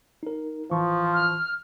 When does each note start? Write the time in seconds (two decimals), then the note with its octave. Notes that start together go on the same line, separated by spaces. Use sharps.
0.23 D#4 A#4
0.71 A1 E3 F3 C#6
1.14 F6